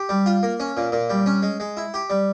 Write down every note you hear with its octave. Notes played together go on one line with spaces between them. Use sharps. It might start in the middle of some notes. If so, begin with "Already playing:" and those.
Already playing: G4
G3
F4
A#3
C#4
A#2
A#2
G3
C#4
G#3
G#3
E4
G4
G3